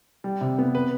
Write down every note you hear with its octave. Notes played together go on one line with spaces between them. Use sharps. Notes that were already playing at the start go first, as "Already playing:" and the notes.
G3
C3
B3
B4